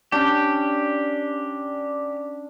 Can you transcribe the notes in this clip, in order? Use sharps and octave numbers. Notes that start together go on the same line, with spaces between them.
C#4 D4 G4